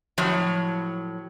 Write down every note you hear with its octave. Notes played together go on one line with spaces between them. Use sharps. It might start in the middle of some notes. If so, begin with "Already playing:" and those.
A2 F3 F#3 C#5